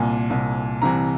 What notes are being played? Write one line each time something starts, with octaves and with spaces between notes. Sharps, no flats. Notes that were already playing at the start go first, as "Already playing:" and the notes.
Already playing: C2 A#2 G#5
C2 A#2
C2 C3 E3 A#5